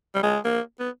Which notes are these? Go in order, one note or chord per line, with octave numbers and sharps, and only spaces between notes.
G3
G#3
A#3
B3